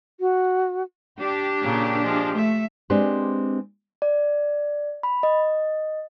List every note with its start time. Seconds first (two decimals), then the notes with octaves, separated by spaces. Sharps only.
0.20 F#4
1.20 D4 G4
1.61 A#2 C#3 A#3
2.03 F3 G#3
2.35 A3 E5
2.90 G#3 C4 D4 G4 B4 C5
4.02 D5
5.03 B5
5.23 D#5